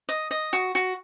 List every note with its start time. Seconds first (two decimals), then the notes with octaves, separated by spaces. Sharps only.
0.09 D#5
0.31 D#5
0.53 F#4
0.75 F#4